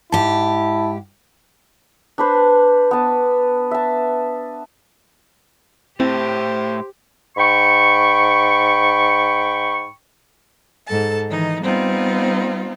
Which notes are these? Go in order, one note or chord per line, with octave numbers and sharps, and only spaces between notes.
G#2 E4 G4 A5
D4 B4 C5
B3 A5
E5 A5
A2 C4 E4 G4 C5
G#2 G5 B5 C#6
G#2 A4 A5
D#3 E3 D#4
G3 B3 C4 D#4 F4